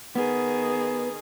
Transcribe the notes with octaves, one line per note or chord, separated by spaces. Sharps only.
D#3 B3 G#4